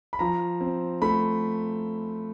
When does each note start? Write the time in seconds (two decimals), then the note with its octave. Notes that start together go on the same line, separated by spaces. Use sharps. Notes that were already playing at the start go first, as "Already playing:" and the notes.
0.13 B5
0.19 F3 A#5
0.61 C4
1.02 A3 B5